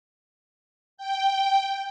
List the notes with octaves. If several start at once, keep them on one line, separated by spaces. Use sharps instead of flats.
G5